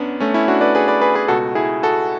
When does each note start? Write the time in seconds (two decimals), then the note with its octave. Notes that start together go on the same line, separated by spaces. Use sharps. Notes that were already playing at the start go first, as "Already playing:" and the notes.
Already playing: F#2 B3 C#4 D4
0.20 A3 C#4
0.34 C#4 E4
0.48 D4 F#4
0.61 B4 D5
0.75 G#4 B4
0.88 B4 D5
1.01 G#4 B4
1.15 G#4 B4
1.28 C#2 B2 F#4 A4
1.55 E4 G#4
1.83 F#4 A4